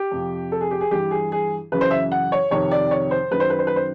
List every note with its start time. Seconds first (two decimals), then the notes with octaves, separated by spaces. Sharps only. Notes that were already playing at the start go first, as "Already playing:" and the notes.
Already playing: G4
0.12 F2 C3 F3
0.52 A4
0.61 G#4
0.71 G4
0.81 G#4
0.91 G2 E3 G4
1.11 G#4
1.32 G#4
1.72 F#2 C#3 E3 B4
1.81 C5
1.91 E5
2.12 F#5
2.32 C#5
2.51 F2 C3 D#3 C#5
2.71 D5
2.91 C#5
3.11 C5
3.31 F#2 D#3 B4
3.40 C5
3.50 B4
3.59 C5
3.67 B4
3.76 C5